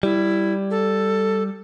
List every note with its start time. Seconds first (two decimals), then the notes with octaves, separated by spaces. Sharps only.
0.03 G3 E4
0.71 A4